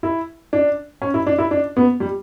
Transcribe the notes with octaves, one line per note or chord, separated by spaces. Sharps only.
E4
D4
C#4
E4
D4
E4
D4
B3
G3